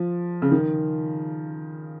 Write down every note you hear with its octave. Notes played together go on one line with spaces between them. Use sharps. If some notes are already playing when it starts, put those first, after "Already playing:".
Already playing: F3
C#3
D#3